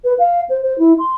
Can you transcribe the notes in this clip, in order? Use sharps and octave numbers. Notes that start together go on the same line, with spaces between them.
B4
F5
C5
C5
E4
C6